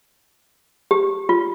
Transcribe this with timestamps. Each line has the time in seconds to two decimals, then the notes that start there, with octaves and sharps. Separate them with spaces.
0.91 G4
1.29 F4